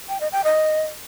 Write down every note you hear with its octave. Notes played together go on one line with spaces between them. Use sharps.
G5
D#5
G5
D#5